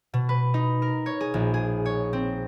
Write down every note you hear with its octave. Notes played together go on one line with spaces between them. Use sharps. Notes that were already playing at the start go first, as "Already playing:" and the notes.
B2
B4
D#4
A#4
C#5
G#4
A#1
G#4
C#5
C4